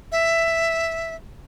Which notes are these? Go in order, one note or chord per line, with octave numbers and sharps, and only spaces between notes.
E5